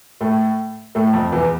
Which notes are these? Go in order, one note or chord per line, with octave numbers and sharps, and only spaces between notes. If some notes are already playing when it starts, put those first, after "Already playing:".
A2 A3
A2 A3
F2 F3
E2 E3